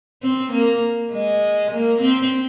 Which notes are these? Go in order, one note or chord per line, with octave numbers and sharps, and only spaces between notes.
C4
A#3
G#3
A#3
C4